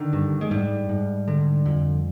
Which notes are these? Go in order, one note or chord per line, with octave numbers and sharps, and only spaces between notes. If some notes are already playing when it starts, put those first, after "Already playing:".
Already playing: D3 D#3
G2
G#3
G#2 G3
G#2
D3
F2